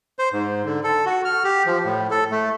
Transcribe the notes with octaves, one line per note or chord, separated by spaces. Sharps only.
C5
G#2
D3
A4
F#4
F6
G4
F3
A2
A4
A3